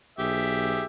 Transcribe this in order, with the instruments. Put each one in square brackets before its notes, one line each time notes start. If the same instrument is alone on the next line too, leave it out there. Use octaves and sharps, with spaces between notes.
[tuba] B1 [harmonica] G4 G#4 E5